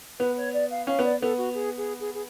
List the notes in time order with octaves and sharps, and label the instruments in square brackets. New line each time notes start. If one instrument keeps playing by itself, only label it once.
[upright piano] B3 [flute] B4
[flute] C#5
D5
F5
[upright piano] C#4 [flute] F5
[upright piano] B3 [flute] D5
[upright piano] B3 [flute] A4
[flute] F#4
G#4
G#4
G#4
G#4